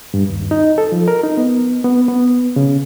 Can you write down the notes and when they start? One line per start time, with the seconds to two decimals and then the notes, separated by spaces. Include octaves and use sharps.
0.14 G2
0.29 D#2
0.51 D#4
0.78 A4
0.92 F3
1.08 A#4
1.24 D#4
1.37 B3
1.84 B3
2.08 B3
2.56 C#3